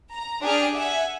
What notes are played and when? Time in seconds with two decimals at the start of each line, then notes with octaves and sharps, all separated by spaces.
0.12 A#5
0.42 D4 G4 G#4 D5 F6
0.74 E5 F#5 G#5